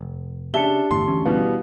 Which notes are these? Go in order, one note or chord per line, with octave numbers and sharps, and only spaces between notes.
F1
C#3 D4 G4 E5 A5 C#7 G7
G1 E2 A2 C6
D2 E3 C#4
B2 G3 B3 E4 F5